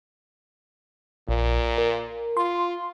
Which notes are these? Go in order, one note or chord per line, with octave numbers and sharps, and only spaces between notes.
A#1 A#2
A#4
F4 C6